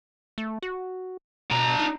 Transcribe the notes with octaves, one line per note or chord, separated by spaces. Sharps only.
A3
F#4
B2 D4 A#5
D#4